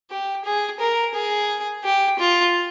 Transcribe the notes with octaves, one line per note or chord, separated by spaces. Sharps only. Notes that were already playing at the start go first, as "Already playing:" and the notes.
G4
G#4
A#4
G#4
G4
F4